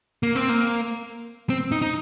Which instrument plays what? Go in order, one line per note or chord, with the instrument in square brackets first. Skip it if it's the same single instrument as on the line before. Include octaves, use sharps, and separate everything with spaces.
[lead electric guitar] A#3
C4
A#3
C4
D#4
D#4